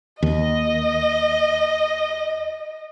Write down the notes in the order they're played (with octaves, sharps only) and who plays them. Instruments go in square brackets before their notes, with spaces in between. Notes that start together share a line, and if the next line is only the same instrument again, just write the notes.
[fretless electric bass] D#2 [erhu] D#5